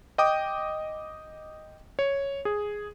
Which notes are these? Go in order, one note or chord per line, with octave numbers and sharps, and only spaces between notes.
D#5 G5 D6 D#6
C#5
G#4